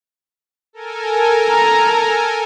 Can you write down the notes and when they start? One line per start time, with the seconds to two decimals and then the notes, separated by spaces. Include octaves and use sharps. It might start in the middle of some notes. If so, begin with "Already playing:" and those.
0.73 A4 A#4 G#5
1.49 A#5